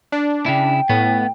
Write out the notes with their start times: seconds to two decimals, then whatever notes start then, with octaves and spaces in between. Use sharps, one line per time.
0.12 D4
0.46 C#3 E4 G5
0.89 A2 B3